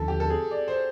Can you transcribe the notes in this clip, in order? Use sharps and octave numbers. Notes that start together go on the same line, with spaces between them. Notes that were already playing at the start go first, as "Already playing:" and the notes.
Already playing: D#2 D3 F3 A4
G4
A4
G#4
D5
C5